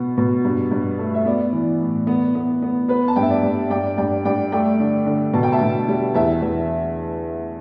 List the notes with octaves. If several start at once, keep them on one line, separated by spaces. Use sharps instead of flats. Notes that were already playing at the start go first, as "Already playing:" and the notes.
Already playing: B2 B3
B2
G2
G2
A3
E5
B3 D5
E3
A2
B3
B3
B3
B3 B4
A5
G2 G5
E5
D5
G2
G2 D5 G5
G2 D5 G5
G2 D5 G5
A3 D5 G5
D3
D3
B2 A5
G5
E5 A5
B2
G3
E2 E5 A5
E2